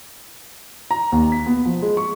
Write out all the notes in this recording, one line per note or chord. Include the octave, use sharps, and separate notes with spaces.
A#5
D#2
B6
B3
F3
G#3
C#6